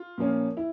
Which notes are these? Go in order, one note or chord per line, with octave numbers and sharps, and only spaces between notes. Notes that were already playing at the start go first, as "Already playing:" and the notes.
Already playing: F4
A#2 F3 A#3 C#4
E4